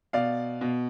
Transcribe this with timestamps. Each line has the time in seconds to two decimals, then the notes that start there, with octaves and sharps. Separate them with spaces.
0.13 B2 D5 F5
0.61 B2